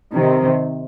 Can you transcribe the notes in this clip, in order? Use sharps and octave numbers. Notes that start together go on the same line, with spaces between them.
C3 D#3